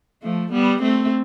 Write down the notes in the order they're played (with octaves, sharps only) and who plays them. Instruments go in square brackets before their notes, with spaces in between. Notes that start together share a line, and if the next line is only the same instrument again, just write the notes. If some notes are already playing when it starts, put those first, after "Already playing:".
[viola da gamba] F3 A3
G3 B3
A3 C4